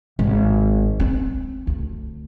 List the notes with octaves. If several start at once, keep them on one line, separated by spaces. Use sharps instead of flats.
G#1
C4
D2